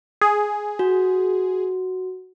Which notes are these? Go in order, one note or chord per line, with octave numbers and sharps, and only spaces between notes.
G#4
F#4